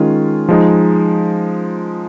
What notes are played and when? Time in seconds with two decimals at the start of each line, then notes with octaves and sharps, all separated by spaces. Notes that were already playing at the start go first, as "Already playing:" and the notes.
Already playing: D#3 G#3 C#4 F4
0.49 F3 G#3 D#4